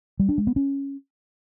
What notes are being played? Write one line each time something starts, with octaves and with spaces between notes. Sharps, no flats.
G3
D4
G#3
B3
C#4